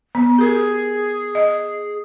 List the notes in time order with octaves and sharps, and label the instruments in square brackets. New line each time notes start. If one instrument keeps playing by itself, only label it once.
[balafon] B3
[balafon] G4 A#4 [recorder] G#4
[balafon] D#5